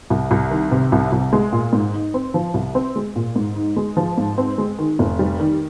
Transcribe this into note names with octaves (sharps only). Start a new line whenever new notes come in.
C2
C2
D#3
C3
C2
C2
G#3
A#2
G#2
D#4
C4
F3
C2
C4
G#3
A#2
G#2
D#4
G#3
F3
G#2
C4
G#3
D#3
F1
G3
D#3